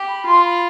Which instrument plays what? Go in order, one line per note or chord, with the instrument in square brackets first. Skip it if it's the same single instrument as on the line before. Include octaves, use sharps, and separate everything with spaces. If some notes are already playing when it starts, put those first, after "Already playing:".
Already playing: [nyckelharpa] G4
[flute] B5
[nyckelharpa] F4 [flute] C6
[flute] B5